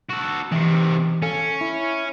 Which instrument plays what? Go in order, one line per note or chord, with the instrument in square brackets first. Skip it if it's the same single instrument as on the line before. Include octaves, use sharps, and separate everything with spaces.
[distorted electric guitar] F#4 A4
[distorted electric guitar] C3 D#3 [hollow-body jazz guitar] E3
[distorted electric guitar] C#4 [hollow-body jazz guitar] A4 F5
[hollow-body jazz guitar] E4